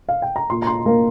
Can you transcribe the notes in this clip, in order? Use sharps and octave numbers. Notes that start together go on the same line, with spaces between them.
F5
G5
A#5
A#2 C6
A#5
C6
A#3 A#4